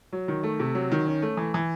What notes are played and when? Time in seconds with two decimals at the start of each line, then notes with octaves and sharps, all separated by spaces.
0.13 F#3
0.28 D#3
0.43 A3
0.60 C3
0.75 F#3
0.92 D#3
1.07 C#4
1.22 A3
1.37 E3
1.54 E3